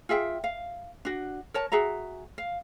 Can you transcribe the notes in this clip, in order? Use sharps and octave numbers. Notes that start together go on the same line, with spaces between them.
F4 G#4 E5 G5
F5
D4 F#4
A#4 C#5 A5
F#4 G#4 E5 A#5
F5